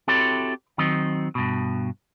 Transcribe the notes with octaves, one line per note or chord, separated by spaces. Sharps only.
C4 E4 F#4 G4 A4 C#5
D#3 F#3 C4 D#5
G2 B2